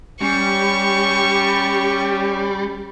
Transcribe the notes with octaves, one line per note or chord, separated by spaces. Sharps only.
G3 C#4 G4 C#6